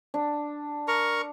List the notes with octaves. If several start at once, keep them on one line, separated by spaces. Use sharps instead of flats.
D4
A#4 A#5 C#6